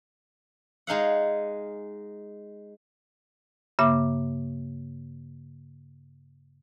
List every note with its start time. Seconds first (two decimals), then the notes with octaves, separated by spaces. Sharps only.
0.87 G#3 D#4 F5 F#5
3.79 G2 C#3 A#3 E5 D6